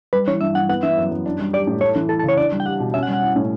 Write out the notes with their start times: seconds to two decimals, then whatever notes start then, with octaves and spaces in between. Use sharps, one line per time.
0.13 G3 B4
0.27 E3 C#5
0.41 G2 E5
0.55 G2 F#5
0.69 B3 F#5
0.83 E3 E5
0.98 F#2
1.11 F#2
1.26 D4
1.40 G3
1.53 G4 D5
1.67 A2
1.81 A3 C#5
1.95 E3
2.09 E4 A4
2.19 A4
2.23 C#3
2.29 C#5
2.37 D4 D5
2.52 G3
2.60 G5
2.65 G4 F#5
2.80 B2
2.94 C#4 E5
3.03 F#5
3.08 G3
3.13 F#5
3.23 E4
3.36 A2